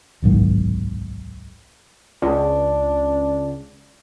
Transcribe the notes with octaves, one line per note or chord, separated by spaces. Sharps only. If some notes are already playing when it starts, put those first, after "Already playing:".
D1 B1 G#2 D#3
C#2 D4